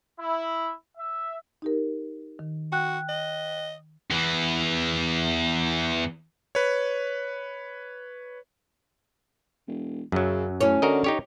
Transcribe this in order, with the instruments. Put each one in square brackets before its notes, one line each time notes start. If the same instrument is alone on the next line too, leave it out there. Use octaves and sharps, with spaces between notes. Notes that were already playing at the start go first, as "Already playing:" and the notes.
[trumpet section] E4
E5
[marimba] D#4 G4 A#4
D#3
[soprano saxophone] F#4 [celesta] G5 F#6
[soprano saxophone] D#5
[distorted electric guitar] E2 E3
[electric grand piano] B4 C#5
[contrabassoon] E1
[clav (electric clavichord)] F#2 F#3 [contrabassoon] C#3
[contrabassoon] A2 [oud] C#4
[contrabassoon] D3 [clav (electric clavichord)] F#4 A#4 D#5
[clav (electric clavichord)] D#4 G4 C#5